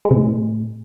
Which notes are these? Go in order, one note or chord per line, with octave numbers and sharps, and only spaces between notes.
G#3
C3
A2